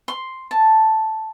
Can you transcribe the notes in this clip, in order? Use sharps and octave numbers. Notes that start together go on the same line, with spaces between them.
C6
A5